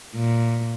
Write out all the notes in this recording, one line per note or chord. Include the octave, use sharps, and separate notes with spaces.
A#2